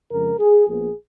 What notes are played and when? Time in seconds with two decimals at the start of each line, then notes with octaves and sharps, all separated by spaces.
0.11 F2 C#3 F3 G#3 A#4
0.39 G#4
0.67 A#1 A#2 F3 B3 G#4